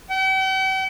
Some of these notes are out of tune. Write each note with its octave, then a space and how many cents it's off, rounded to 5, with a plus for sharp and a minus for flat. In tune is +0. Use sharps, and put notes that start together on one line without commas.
G5 -45